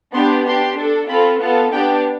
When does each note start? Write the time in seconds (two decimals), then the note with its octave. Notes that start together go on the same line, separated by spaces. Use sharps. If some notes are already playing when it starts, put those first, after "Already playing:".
0.14 B3 D4 G4 C6
0.46 D4 G4 C6
0.78 D4 A4
1.09 C4 F4 A4 B5
1.40 B3 F4 A4 A5
1.72 B3 D4 G4 G5